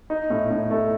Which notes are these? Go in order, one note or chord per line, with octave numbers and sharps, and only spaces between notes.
D#4
A2
A2
A3